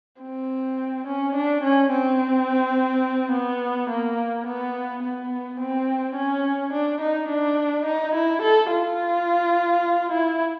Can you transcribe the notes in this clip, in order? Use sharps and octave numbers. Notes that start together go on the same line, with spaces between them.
C4
C#4
D4
C#4
C4
B3
A#3
B3
B3
C4
C#4
D4
D#4
D4
D#4
E4
A4
F4
E4